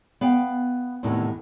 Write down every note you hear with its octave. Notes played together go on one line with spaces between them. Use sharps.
B3 F5 G5
E2 A2 C3 D#3 E3